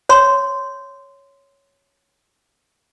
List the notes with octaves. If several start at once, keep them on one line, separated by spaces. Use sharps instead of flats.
C#5 C6